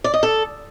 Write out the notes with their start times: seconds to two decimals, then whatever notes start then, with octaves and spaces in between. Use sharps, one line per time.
0.04 D5
0.14 D#5
0.23 A4